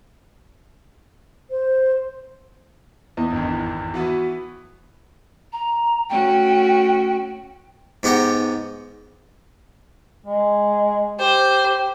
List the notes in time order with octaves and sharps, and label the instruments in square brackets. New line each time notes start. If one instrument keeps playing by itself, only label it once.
[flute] C5
[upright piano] E2 [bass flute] E4 [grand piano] D#5
[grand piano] G#1 F2 [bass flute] D4
[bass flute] E4
[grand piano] E3 B3 E4 [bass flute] F#4
[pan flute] A#5
[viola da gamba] A3 C#4 F#4 [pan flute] G5
[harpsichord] G#2 B3 G4 F#5 A#5
[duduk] G#3
[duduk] G4 [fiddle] C5